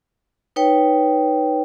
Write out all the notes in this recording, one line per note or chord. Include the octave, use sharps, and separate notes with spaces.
D#4 B4 C#5 G5